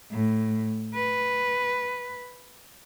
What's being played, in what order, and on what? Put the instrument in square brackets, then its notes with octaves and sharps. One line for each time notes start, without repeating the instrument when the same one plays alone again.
[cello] A2
B4